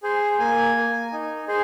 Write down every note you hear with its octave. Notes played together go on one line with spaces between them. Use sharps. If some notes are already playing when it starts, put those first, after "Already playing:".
G#4 C5
A#3 G#5
A#3
D#4
G#4 C5